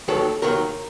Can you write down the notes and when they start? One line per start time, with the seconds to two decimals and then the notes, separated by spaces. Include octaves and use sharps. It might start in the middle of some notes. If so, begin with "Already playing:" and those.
0.08 D#2 D#3 F#3 A4
0.42 D#2 D#3 F#3 A#4